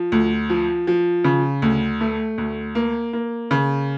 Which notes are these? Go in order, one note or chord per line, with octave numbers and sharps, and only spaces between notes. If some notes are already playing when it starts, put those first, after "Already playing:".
Already playing: F3
D2
F3
F3
C#3
D2
A3
D2
A#3
A#3
C#3